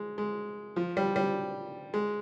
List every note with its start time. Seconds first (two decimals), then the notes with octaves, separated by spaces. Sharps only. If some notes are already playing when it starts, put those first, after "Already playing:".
Already playing: G#3
0.18 G#3
0.76 F3
0.97 G3
1.16 G3
1.94 G#3